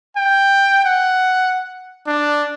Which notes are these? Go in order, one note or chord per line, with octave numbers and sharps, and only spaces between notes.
G5
F#5
D4